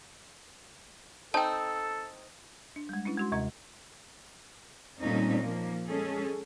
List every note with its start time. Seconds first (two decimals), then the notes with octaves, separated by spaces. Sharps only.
1.34 C4 D#4 A4 G5 A5
2.76 D4
2.89 G3 G#3
3.05 C#4 D4 E4 B4
3.17 G#3 F#4 C6
3.32 D#2 C3 G#3 D#5 A#5
4.99 A#2 G3 A3 C4 C#4 D#4
5.41 F3 A#3
5.87 G#3 C#4 G#4 A4